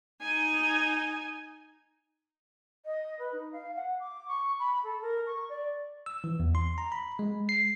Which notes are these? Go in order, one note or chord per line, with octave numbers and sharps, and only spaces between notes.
D#4 G#5
D#5
B4
D#4
F5
F#5
D6
C#6
B5
A4
A#4
C#6
D5
E6
E3
E2
C6
A#5
B5
G#3
C7